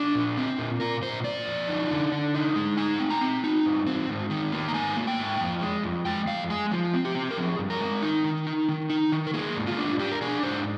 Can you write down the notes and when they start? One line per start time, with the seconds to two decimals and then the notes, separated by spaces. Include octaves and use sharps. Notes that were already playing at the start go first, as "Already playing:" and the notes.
Already playing: D4 G#4
0.15 A#2
0.37 C4
0.59 A#2
0.80 A#2 A#4
1.02 A#2 C5
1.24 A#2 D5
1.46 F2
1.68 D#4
1.91 D3
2.12 D3
2.34 D#4
2.56 G#3
2.77 D#4 G#5
3.00 C4
3.10 A#5
3.21 C4
3.44 D#4
3.65 G2
3.87 C4
4.09 G#2
4.30 D#3
4.52 A#3
4.68 A#5
4.74 G#2 G#5
4.97 A#3
5.07 G5
5.19 G#2
5.40 F2
5.61 G#3
5.83 F2
6.05 G#3 G5
6.27 F2 F5
6.50 G#3 G#4
6.72 F3
6.94 C4
7.05 G4
7.15 C4
7.31 A#4
7.38 F3 G#4
7.59 G2
7.70 A#4
7.81 G#3
8.02 D#4
8.24 D#3
8.47 D#4
8.68 D#3
8.90 D#4
9.12 D#3
9.27 A#4
9.33 A#3 G#4
9.56 G#2
9.67 F4
9.78 D4
9.99 D4 G4
10.12 A#4
10.21 D4 G#4
10.43 G#2 C5